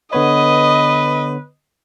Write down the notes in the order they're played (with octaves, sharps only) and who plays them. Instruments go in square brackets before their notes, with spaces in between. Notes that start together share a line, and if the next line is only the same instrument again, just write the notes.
[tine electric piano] D3 B3 C#5 [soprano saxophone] B4 [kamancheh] D#5